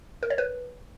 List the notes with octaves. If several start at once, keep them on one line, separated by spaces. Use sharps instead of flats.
A#4
C#5
B4